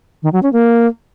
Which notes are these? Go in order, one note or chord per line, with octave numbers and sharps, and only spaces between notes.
D#3
F#3
C#4
A#3